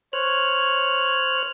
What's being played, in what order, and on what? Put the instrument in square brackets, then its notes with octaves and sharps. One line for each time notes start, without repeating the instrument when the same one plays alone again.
[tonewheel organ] C5 F6 F#6 [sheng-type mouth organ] C#5